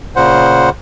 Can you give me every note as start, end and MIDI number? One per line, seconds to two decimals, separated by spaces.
0.16 0.70 46
0.16 0.70 49
0.16 0.70 72
0.16 0.70 78